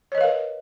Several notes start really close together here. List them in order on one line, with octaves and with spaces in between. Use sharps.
C#5 D#5 B4 F5 A#4